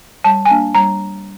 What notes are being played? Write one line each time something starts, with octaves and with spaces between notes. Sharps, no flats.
G3 A5
G#5
A#3 D4 A5
G3 A#5